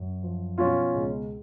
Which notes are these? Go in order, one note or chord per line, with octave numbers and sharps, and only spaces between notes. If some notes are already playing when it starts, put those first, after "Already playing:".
Already playing: F#2
F3
B2 C#4 F4
C#2